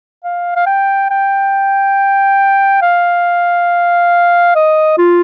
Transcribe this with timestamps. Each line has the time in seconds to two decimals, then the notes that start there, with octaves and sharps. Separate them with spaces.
0.24 F5
0.56 F5
0.66 G5
1.10 G5
2.82 F5
4.55 D#5
4.98 F4